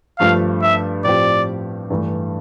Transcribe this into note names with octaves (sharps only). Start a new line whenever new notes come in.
G2 F3 A3 F5
E5
A2 F3 C4 G4 D5
G2 E3 A3